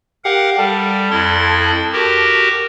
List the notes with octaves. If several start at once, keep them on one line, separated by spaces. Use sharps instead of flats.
G4 A#4 F5 F#5
G3 A4
F2 E4 C6
F#4 G4 A#4